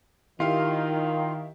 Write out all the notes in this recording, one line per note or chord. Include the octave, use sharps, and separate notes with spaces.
D#3 E4 F4 G4 F5